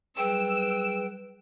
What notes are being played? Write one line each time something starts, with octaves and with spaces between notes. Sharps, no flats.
F#3 G3 G#4 B4 G5 E6